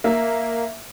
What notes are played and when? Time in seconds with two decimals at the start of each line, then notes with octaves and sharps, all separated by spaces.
0.04 A#3 E5